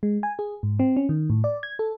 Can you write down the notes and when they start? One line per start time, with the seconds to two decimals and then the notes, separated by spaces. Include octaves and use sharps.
0.03 G#3
0.23 G#5
0.39 G#4
0.63 G#2
0.79 C4
0.97 C#4
1.09 D#3
1.30 A2
1.44 D5
1.63 G#6
1.79 A4